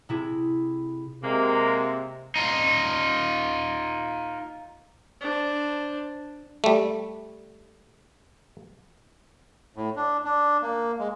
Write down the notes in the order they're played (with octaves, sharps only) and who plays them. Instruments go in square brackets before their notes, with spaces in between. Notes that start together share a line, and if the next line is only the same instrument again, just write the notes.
[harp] C3 E4 G#4
[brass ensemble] C3 [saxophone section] G#3 A#3
[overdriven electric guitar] D#4 F4
[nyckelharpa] D4 C5
[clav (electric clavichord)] G3 A3
[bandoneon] A2
D4
D4
A#3
G#3